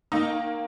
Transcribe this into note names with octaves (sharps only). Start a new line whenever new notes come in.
D#3 A#3 D#4